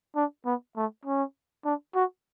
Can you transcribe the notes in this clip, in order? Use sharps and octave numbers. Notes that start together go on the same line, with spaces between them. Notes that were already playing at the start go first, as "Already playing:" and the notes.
D4
B3
A3
C#4
D4
F#4